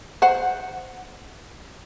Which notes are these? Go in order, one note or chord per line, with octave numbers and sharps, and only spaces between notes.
C5 F#5